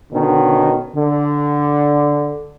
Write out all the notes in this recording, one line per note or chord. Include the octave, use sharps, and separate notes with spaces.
B2 D3 D#3 C#4
D3